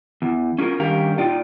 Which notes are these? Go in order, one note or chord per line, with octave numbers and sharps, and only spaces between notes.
E2
C#4 F4 G#4 A#4
G2 D#3 C#4 G4 A#4 F5
A#2 D#4 F4 D5 G5